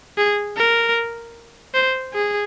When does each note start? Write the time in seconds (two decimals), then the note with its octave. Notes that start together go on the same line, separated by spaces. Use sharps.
0.18 G#4
0.57 A#4
1.74 C5
2.14 G#4